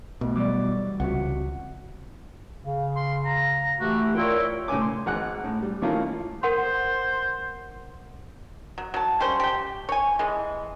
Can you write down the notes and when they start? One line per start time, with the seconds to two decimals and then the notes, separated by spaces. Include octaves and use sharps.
0.21 C2 B2 A3
0.36 E3 F#3 G3 D5 D6
1.00 C#2 C3 F#4 F#5
2.65 C#3 F5
2.96 C6
3.25 A#5
3.80 E3 A3 F#4 G4
4.17 E4 F4 A#4 C#5 D5 G5
4.68 A2 C#3 C#4 G#5 D6
4.81 C6
5.06 G#1 F#5 F#6
5.44 A2
5.62 G3
5.82 D#3 A3 A#3 C#4 E4 F4
6.43 A#4 C5 F#5 C6
8.78 F#3
8.94 F#3 A5
9.20 G3 C#4 C5
9.40 G4 G5
9.89 C#5 G#5
10.19 E3 G#3